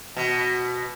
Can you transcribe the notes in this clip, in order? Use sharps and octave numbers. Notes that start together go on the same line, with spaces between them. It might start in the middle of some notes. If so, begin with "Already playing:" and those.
B2